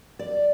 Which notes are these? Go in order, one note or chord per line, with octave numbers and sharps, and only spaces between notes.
D5